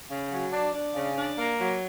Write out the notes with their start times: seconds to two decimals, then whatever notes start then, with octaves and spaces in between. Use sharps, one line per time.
0.09 C#3
0.31 F#3
0.51 D4
0.73 D4
0.95 C#3
1.17 D4
1.37 A#3
1.60 F#3